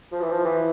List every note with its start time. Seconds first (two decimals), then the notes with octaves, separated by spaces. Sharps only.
0.12 F3
0.21 E3
0.30 F3
0.45 E3